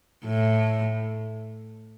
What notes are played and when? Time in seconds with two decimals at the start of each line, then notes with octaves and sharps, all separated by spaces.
0.25 A2